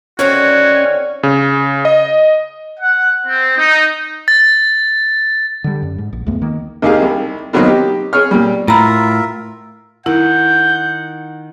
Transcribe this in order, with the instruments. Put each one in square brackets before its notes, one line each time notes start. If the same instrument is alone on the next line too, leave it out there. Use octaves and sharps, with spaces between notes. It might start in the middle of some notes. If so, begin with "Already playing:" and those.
[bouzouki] D3 D#3 C4 [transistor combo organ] C#4 G#5 [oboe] F#4 [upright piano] C#5
[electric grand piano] C#3
D#5
[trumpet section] F#5
C4
D#4
[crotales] A6
[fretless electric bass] D3 G3
F#2
G#2
A#1
C#2 F#2 A3 B3
D#3 A#3
[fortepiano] D#2 A#3 D#4 G4 G#4 F5
C2
B2 D#3 F#3 A#3 C4 D#4
G4
G#4 C#5 F6
A#2 G3
[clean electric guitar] A2 [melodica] F4 A#4 E5 [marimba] A#5 B5
[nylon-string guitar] D#3 [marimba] E4 [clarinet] F#5 [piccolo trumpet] G6